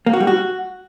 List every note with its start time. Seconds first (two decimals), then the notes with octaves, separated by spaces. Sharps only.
0.06 A#3
0.13 F#4
0.20 G3
0.27 F#4